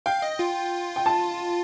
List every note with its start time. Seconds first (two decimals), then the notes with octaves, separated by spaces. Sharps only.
0.06 F5 G5
0.22 D#5
0.39 F4
0.96 G5
1.06 A5